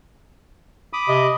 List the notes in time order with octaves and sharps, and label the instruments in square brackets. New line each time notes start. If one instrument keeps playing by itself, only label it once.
[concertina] B5 D6 D#6
[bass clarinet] C3 [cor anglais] D#5